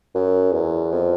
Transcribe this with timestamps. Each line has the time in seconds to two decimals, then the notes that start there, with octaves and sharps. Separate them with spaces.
0.15 F#2
0.53 E2
0.92 F2